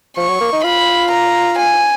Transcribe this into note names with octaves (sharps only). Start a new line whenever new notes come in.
F3 C#6
F#3
A#3
D#4
F4 B5
A#5
G#5